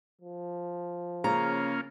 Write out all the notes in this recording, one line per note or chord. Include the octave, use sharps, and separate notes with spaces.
F3
C#3 A#3 C#4 F4 A#5